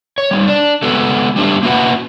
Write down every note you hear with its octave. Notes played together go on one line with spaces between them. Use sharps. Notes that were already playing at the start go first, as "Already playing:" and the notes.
C#5
G3 C4 D#4
D4 D5
G#3 A3 B3 F#4 A4
G3 A3 D4 F4 G4
A#3 C#4 E4 F#4 B4 F#5